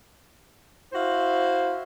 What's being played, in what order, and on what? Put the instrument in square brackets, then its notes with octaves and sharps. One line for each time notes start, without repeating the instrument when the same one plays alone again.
[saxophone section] E4 F#4 C5 F5